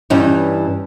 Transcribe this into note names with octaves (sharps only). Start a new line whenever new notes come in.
G2 E3 C#4 D#4